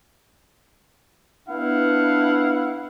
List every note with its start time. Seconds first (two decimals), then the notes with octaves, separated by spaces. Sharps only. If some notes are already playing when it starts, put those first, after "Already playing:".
1.49 B3 D4 E4 F5 F#5